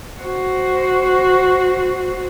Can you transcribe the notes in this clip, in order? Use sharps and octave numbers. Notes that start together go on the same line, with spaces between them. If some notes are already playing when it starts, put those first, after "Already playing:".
F#4 C5